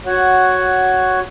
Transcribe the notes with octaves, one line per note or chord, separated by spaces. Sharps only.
F#4 C#5 F#5